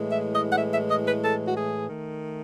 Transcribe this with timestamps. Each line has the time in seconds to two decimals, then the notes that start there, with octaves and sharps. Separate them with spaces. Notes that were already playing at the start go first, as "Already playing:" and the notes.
Already playing: A2 E3 G#3
0.12 E5
0.34 D#5
0.51 F#5
0.57 E5
0.72 E5
0.90 D#5
1.06 B4
1.23 A4
1.46 F#4
1.56 G#4
1.88 D#3 A3